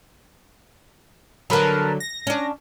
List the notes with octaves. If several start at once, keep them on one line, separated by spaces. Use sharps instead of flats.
D3 F#3 A#4 B4 A5
A#6
C#4 D4